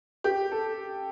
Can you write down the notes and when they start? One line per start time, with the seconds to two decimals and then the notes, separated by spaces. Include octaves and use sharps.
0.24 G4
0.52 A4